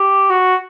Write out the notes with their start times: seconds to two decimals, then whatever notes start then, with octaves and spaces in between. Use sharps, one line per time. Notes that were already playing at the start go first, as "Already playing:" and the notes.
Already playing: G4
0.30 F#4